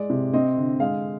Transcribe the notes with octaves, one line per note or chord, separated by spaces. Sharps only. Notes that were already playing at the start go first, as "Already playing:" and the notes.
Already playing: G#3 D5
C3
C4 D#5
D3
G#3 F5